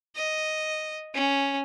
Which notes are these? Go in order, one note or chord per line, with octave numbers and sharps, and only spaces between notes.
D#5
C#4